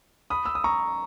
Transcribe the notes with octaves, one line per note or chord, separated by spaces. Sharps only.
B5 D#6
E6
D#6
A#5 C#6